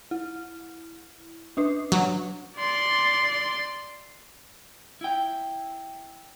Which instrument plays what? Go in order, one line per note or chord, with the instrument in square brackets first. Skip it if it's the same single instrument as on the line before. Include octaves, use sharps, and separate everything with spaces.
[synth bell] E4
C#4 D4 B4
[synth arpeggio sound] F#3
[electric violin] D5 C6
[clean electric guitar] E4 G5